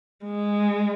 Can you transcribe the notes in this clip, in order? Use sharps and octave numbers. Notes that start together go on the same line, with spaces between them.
G#3